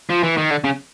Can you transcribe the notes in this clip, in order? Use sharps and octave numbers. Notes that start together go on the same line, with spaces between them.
F3
E3
D#3
D3
C#3